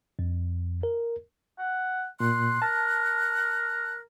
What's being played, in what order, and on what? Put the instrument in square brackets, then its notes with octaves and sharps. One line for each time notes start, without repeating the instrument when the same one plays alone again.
[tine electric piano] F2
A#4
[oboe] F#5
[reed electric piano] A#2 [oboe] C6 [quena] F#6
[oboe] A#4 [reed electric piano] A5